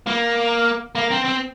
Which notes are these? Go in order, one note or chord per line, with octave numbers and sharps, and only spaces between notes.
A#3
A#3
C4
C4